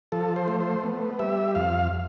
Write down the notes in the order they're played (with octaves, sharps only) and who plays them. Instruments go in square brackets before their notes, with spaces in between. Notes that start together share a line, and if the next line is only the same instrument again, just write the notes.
[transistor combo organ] F3 A4
C5
A3
C5
B3
G3 E5
F2 F5